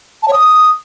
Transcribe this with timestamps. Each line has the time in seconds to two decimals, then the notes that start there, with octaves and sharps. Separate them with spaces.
0.22 A5
0.28 C#5
0.33 D#6